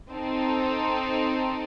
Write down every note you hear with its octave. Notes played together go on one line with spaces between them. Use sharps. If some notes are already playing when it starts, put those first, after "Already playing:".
C4 D#4 A4